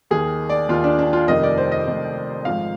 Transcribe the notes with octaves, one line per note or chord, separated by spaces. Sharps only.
D#2 D#3 G#4
D5
D#2 D#3 F4
D4
D4
F4
F1 F2 D#3 D#5
D5
C5
D#5
F1 F2 D#3
G#1 G#2 F3 F5